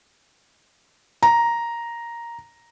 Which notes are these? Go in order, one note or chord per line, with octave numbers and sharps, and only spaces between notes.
A#5